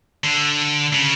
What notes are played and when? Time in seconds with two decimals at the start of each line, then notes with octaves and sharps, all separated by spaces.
0.24 D3
0.93 C#3